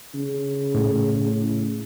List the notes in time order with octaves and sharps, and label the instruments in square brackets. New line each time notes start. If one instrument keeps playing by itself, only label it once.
[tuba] C#3
[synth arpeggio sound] A2